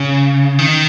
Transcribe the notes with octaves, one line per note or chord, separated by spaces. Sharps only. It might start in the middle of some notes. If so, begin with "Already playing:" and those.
Already playing: C#3
D#3